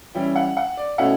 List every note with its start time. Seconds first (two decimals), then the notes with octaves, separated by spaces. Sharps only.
0.15 E3 G3 C#4 E4 G5
0.36 F#5
0.57 F#5
0.77 D5
0.98 B2 A3 C#4 E4 F#5